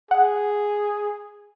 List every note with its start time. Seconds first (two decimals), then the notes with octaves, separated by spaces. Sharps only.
0.11 G#4 F#5